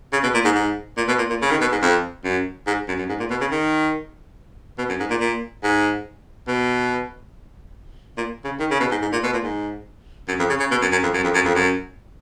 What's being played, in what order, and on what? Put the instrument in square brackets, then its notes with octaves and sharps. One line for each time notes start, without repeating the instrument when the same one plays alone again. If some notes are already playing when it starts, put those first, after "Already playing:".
[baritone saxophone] C#3
B2
A#2
G#2
G#2
A#2
B2
A#2
A#2
C#3
D#3
B2
G#2
F2
F#2
G#2
F#2
F#2
G#2
A#2
B2
C#3
D#3
B2
F#2
G#2
A#2
A#2
G#2
B2
A#2
C#3
D#3
C#3
B2
G#2
G#2
A#2
B2
A#2
G#2
F#2
F2
C#3
C#3
B2
F#2
F#2
F2
F#2
F2
F#2
F2
F#2